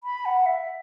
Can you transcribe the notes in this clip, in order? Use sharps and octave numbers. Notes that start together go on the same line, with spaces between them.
B5
F#5
E5